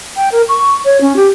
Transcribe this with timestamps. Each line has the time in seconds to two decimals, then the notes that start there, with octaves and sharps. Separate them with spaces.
0.16 G5
0.31 A#4
0.48 C#6
0.85 C#5
1.01 C#4
1.16 G4